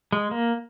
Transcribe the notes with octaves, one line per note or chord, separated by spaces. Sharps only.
G#3
A#3